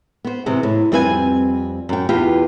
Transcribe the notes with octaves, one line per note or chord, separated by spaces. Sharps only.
B3 C5
G#2 C3 E3 G#3
A2
F2 G3 C4 B4 G5 G#5
F#2 G5
E2 F4 G4 B4 G5